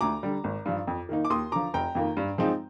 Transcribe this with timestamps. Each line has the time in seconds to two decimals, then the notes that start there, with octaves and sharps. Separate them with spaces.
0.01 D2 A#5 D6
0.23 D3 G3
0.44 G#1
0.66 G2 F3
0.87 F2
1.09 D#3 A#3 D#4
1.25 D6
1.30 D#2 C6 D#6
1.52 D3 F3 A#5 D6
1.74 F1 G5 A#5
1.95 F2 D#3 A#3
2.17 G2
2.38 F3 G#3 C4 D#4